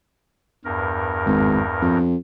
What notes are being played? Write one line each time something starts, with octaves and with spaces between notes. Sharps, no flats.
E2 G2 A#4
G#1
F2